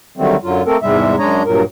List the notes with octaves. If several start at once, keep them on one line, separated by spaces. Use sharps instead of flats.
D3 D#3 F#3 G3 A3 C4
F#2 D3 F#3 F4
A3 A#3 C4 A4 A#4
E2 G#2 C3 G3 G#3 E5
F#2 G#3 D4 C#5 D#5 A#5
G2 A#2 F#3 A#4